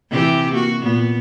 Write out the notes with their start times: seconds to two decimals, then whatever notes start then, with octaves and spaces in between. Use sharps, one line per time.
0.10 C3 E3 G4
0.52 A#3 F#4
0.81 A#2 B3